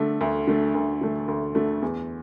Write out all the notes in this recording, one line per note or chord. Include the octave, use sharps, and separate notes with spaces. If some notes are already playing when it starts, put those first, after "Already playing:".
Already playing: D3 A3
D2
D3 A3
D2
D3 A3
D2
D3 A3
E2